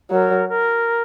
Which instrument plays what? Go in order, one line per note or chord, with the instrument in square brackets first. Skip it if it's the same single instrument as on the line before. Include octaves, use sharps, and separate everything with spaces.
[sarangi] F#3 [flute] A#4
[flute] A#4